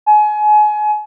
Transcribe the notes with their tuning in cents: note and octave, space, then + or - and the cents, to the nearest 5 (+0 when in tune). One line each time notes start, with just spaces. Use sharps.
G#5 +30